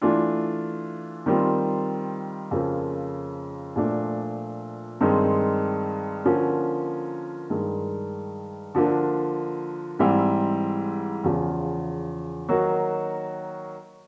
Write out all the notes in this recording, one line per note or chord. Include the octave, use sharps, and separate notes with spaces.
E3 A3 D4 F4
D#3 G3 C4 F4
F2 C#3 F3 A#3
A#2 F3 A3 D4
G2 D#3 G#3 C4 D#4
D3 F3 A#3 C#4
G2 D#3 G#3
D3 F3 A#3 D4
G#2 E3 G3 C4 E4
E2 C#3 F3
D#3 F#3 A#3 D#4 F#4